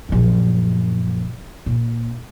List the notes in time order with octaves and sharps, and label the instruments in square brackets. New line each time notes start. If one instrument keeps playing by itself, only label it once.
[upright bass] A#1 F#2
A#2